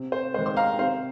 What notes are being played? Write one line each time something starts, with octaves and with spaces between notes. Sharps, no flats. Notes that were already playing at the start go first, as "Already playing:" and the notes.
Already playing: C3
C5
D#3 G#3 C5
C6
F5 A#5
C3 C5 F5